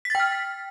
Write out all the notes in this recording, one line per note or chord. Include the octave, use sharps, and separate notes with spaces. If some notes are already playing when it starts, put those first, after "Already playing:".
G5 F6 A6 B6